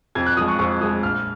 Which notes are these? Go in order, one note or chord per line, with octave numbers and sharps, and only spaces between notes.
F2 G#6
F#6
F3 G#3 D#6
C#6
F2 C#6
F3 G#3 D#6
A#1 F6